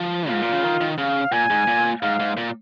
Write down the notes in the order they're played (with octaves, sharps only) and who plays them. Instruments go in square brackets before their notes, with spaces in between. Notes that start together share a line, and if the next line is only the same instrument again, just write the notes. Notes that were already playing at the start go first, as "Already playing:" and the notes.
Already playing: [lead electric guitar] F3
[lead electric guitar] G#2 [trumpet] F4
[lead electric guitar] A#2
C#3
D#3
D#3
[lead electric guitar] C#3 [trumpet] F5
[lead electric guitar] A#2 [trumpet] G#5
[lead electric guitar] G#2
A#2
[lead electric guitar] G#2 [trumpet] F5
[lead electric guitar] G#2
A#2